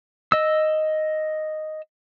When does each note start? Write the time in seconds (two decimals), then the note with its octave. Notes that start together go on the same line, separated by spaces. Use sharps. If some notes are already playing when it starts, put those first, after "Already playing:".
0.32 D#5 E6